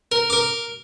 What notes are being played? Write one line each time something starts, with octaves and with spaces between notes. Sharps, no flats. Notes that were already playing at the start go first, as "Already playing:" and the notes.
A#4
A#4 D6